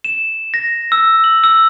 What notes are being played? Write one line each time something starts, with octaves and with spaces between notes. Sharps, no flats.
E7
A#6
E6
F#7
E6